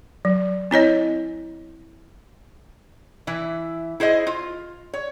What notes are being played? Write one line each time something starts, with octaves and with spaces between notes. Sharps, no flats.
F#3
C4 E4 C#5 D#5
E3 E4
E4 G#4 C5 D#5
F4
C#5